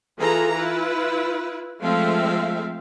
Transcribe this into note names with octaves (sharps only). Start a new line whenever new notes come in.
E3 F4 G#4 A4 A#5
E4 F4 B4
F3 G#3 A3 C4 E5 F5